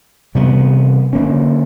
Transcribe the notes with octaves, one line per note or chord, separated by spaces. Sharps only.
C3 E3 G3 B3
D3 F#3 A#3 C#4